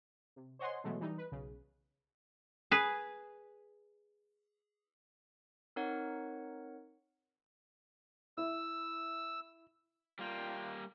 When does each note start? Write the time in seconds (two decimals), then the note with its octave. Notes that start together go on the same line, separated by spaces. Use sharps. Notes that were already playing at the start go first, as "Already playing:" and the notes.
0.36 C3
0.59 C5 C#5 D#5 F#5 G#5 C6
0.84 B2 E3 F#3 G#3 A3
1.01 E3 G3 D#4
1.18 B4
1.32 B1 C#3
2.71 G#4 B4
5.76 C4 D#4 A#4 C#5 F#5
8.38 E4 E6
10.19 G3 A#3 F4 G5